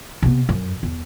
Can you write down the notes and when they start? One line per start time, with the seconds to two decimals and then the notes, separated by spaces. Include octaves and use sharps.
0.22 C3 B3
0.49 F#2
0.83 E2